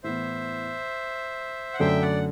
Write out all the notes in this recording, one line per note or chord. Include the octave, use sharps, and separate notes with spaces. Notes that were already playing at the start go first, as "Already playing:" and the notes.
A2 E3 B3 C5 E5
F#5
F#2 D3 A3 D4 A4 E5 G5
D5 F#5